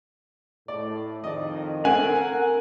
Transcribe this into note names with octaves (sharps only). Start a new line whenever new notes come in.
A2 D5
F2 D#3 D5 D#5
A3 A#3 C4 A#4 F#5 G#5